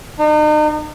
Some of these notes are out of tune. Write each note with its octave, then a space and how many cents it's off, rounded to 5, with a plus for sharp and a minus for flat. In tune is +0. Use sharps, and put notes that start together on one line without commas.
D#4 -40